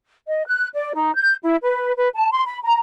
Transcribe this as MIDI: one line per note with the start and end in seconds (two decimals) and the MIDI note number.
0.27 0.42 75
0.45 0.67 90
0.74 0.92 74
0.95 1.14 63
1.14 1.36 91
1.43 1.56 64
1.62 1.93 71
1.98 2.08 71
2.14 2.29 81
2.31 2.43 84
2.45 2.59 83
2.63 2.77 82